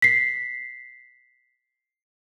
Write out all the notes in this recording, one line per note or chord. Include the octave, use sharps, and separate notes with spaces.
B6 C7